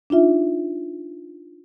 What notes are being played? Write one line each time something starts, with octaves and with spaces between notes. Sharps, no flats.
D4 D#4 F4 E5